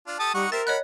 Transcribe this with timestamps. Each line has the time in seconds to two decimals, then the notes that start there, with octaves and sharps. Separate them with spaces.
0.07 D4 F4
0.19 G4 A4 A5 D#6
0.34 G3 D#4 F#5 C#6
0.52 G4 A#4 C5 E5 A6
0.67 C#5 D#5 F#5 B5 F#6